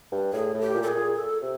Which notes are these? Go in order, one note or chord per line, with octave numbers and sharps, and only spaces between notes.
G2
A2 G#4
A2
G4
A#2
A4
G#4
A#2
A4
C3